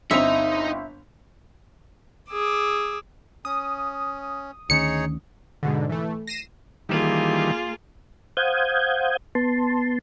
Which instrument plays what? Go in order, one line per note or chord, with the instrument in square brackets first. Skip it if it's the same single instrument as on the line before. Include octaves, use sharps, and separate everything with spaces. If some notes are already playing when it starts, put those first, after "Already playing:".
[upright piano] G1 C4 F7 [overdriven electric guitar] D#4 D#5 [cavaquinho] E5
[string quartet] G#4 D6 E6
[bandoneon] C#4 [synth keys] D#6
[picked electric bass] D2 D#3 C#4 [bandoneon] D#4 G#4 C#5 [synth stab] C#7
[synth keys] G#2 B2 D3
E3 A3
A#6 C7 D#7 E7
[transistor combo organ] D#3 E3 G3 [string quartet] A#3 F4 G#4
[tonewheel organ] C5 F5 F#5 D#6 G6 G#6
B3 A5 C6